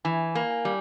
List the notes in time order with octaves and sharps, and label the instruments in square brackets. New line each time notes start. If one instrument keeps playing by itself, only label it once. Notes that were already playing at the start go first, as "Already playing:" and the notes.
[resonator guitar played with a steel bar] E3 [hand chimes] G#5
[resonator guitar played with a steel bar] A#3
[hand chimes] G#5
[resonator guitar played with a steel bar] G3